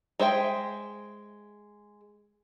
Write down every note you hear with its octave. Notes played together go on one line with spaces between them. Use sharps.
G#3 C5 E5 G5